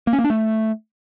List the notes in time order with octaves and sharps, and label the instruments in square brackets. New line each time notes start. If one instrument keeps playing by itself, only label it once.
[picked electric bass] A#3
C#4
A#3
D4
A3